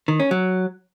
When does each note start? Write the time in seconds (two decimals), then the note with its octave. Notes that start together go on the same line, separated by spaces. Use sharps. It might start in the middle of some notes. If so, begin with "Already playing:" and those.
0.08 D#3
0.20 C#4
0.31 F#3